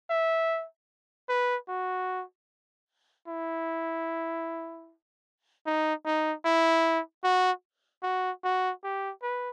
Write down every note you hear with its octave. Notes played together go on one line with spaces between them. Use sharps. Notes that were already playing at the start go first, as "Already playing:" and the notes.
E5
B4
F#4
E4
D#4
D#4
E4
F#4
F#4
F#4
G4
B4